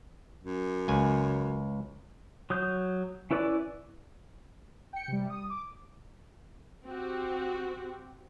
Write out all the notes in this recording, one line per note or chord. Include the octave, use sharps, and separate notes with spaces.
F#2
C#2 G#5
F#3 D#6 G6
C#4 E4 B4 D5 D6
G5 C#7
C3 G3
D#6
D6
C4 F#4 G4